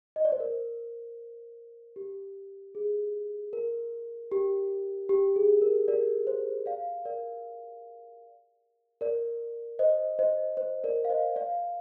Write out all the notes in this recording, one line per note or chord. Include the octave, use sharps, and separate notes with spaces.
D#5
D5
C5
A#4
G4
G#4
A#4
G4
G4
G#4
A#4
A#4 D5
C5
D5 F5
A#4 D5
A#4 D5
C5 D#5
C5 D#5
C5
A#4 D5
F5
C5 D#5
D5 F5